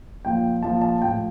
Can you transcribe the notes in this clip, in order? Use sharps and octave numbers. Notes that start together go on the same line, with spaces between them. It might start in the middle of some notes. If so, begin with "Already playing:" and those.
A#2 F3 G5
A#2 F3 A5
A5
A2 F3 G5